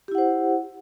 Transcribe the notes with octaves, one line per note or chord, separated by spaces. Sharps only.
E4 G4 C5 F#5